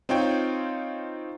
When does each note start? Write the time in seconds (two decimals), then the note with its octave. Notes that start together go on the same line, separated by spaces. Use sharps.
0.09 C4 D#4 F4 C#5 G5